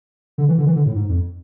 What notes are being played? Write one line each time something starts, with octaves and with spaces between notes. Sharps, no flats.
D3
E3
D3
E3
D3
A2
G#2
F2